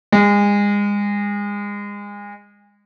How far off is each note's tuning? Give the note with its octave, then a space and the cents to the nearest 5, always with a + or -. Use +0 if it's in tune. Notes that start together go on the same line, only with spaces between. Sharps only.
G#3 -30